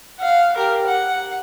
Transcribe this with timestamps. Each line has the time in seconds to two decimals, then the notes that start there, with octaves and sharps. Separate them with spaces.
0.19 F5 F#5
0.57 G4 A#4
0.86 F#5